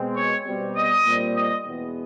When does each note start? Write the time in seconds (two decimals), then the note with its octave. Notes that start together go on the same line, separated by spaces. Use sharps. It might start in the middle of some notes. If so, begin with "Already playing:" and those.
Already playing: B2 G#3 C4
0.16 C#5
0.45 B2 G3 C4
0.76 D#5
1.06 A#2 G3 C4
1.35 D#5
1.65 E2 B2 G#3 B3